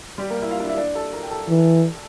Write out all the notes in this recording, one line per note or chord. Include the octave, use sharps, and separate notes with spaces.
G3 G4
A#3 A#4
E4 E5
F4 F5
D4 D5
E4 E5
D4 D5
A4 A5
A#4 A#5
G5
A4 A5
E3